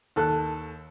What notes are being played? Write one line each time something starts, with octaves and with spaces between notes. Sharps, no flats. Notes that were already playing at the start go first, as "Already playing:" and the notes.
D#2 A4 F#6